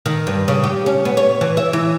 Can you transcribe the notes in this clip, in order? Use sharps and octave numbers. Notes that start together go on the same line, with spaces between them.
D#3
G2
C#3
G4
C#4
B3
C#5
E3
E5
E3